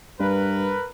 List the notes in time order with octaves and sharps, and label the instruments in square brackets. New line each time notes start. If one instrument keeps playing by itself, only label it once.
[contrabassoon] G2 [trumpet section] A#4 B4